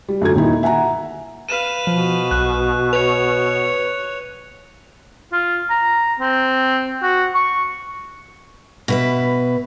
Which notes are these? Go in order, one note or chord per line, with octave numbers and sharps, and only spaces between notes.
G3
F#2 D3 A3 F4 G#6
D#1 A#2 D#3 D#4 E4
E5 F#5 G#5 A#5
B4 F5 D#7 E7
B2 F3
B1 F#6
B4 C#5 F7
F4
A#5
C4
F#4
C#6
B2 B4 E5